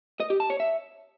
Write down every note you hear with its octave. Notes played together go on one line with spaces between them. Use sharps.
D#5
G4
A5
C#5
E5